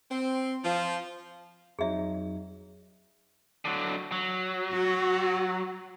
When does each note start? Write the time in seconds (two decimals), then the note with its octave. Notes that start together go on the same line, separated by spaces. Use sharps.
0.11 C4
0.64 F3
1.79 F2 F#3 D#4 G#4 E5
3.65 D3 F#3
4.12 F#3
4.72 F#4